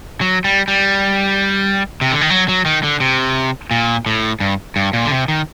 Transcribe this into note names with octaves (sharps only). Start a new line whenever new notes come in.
F#3
G3
G3
C3
D3
D#3
F#3
F#3
D#3
D3
C3
A#2
A2
G2
G2
A#2
D3
C3
D#3